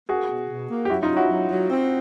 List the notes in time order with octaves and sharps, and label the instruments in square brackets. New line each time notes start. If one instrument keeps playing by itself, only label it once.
[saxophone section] A#3 [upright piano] F#4 G#4
[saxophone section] B2
B2
A#3
[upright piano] G4
[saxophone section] F#3 [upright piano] E4 F#4
[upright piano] D#4 F4
[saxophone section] F#3
[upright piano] E4 F#4
[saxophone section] F#3
F#3
C4